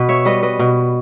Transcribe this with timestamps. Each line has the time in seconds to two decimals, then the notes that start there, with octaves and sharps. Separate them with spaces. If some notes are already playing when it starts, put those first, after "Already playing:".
Already playing: B2 B4
0.09 C#5 E5
0.25 G3 B4 D#5
0.43 B4 D#5
0.59 B2